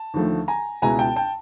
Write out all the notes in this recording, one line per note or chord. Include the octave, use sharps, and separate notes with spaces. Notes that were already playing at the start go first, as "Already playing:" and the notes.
Already playing: A5
D#2 D3 F3 A3
G#5 A#5
C#2 B2 G#3 B3 E4 G#5 A#5
G5 A5
G5 A5